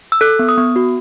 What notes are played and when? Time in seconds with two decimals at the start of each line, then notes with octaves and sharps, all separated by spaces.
0.12 E6
0.21 A4 F#6
0.39 B3
0.49 D#6
0.57 B3
0.76 F#4